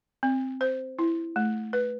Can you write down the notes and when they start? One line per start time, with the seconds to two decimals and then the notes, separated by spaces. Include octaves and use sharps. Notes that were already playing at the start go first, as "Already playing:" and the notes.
0.23 C4
0.61 C5
0.99 E4
1.36 A3
1.73 B4